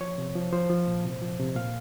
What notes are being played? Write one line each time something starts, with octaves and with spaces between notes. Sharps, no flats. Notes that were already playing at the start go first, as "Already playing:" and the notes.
F3 C#5
C3
F3
F3 C5
F3
A#2
C3
F3
C3
A#2 F5